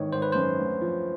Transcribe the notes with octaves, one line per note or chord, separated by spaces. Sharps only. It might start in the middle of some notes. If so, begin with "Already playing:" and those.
Already playing: G#1 D#3 E3 C#5
G#1 C5
B4
F#2 C5
D2
F3